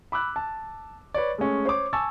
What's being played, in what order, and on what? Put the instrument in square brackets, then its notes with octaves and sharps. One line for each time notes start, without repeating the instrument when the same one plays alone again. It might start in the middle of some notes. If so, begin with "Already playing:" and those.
[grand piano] B5 D6 E6 F#6
A5
B4 C#5 D5
G#3 A3 C#4
C5 C#5 D6
G#5 A5 C#6 E6 A6